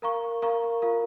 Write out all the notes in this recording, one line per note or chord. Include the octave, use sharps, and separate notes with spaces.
A#4 F5 A#5 C#6
A#4 F5 A#5 C#6
F4 A#4 F5